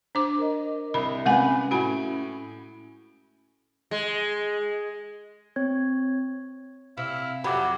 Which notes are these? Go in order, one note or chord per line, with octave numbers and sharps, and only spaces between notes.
D4 C5 D6
A#4 D#5
C2 B5
C3 G#3 C#4 B4 F#5 G#5
A2 F#4 G#5 B5 D7
G#3
C4 C#5 G#6
C3 E4 F5
F2 C3 F#3 F#5 B5 D6